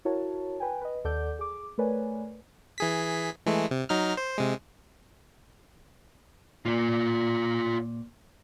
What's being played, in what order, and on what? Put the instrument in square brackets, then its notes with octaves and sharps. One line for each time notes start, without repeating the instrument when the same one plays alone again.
[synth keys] E4 F#4 A#4 C#5 A5
B4 G5 G#5
B4 D#5
D#2 A4 D5 F#5 D6 G6
G#4 D6
A3 A#4 B4 C#5 D5 G#5
[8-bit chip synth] E3 G#4 B6
E3 G#3 A3
C3
F#3 D#4 F6
C5
C3 G#3
[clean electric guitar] A#2 [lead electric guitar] F4 D5